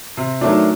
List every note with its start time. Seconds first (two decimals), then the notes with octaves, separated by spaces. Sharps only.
0.17 C3
0.41 D#3 F#3 A3 D4